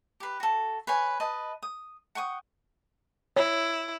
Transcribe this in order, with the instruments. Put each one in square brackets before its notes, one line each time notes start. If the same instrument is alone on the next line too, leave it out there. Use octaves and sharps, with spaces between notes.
[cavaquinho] G4 B4
F#4 A4
B4 C#5 G#5
B4 D#5 A5
D#6
F#5 G5 C#6 D#6
[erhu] E4 [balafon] C#5